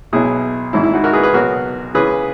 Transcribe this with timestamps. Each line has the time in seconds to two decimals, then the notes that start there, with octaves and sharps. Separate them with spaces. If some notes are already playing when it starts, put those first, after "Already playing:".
0.13 B1 B2 F#3 E4 G#4
0.73 G#1 G#2 E3 E4
0.84 E4
0.94 D#4 F#4
1.04 F#4 A#4
1.13 G#4 B4
1.23 G#4 B4
1.34 B1 B2 F#3 F#4 A#4
1.95 C#2 C#3 E3 G#4 B4